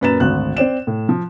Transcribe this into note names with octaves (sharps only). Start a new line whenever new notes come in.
F#2 A#2 B4 A#5 A6 E7
G#1 D2 F#6
C4 C5 D5 E7
A2
F3